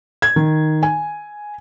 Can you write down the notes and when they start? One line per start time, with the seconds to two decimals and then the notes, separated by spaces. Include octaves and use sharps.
0.22 G#6
0.36 D#3
0.83 G#5